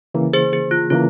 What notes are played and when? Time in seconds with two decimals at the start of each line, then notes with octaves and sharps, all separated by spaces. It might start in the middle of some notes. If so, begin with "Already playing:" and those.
0.14 C#3 E3 A#3
0.33 G#4 C5
0.53 G#4
0.71 F4
0.90 C#3 E3 A#3 F4